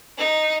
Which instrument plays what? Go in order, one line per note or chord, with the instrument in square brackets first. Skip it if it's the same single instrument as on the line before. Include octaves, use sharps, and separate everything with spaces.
[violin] D#4